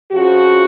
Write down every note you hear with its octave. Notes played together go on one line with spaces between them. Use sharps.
F2 C#3 F3 F#4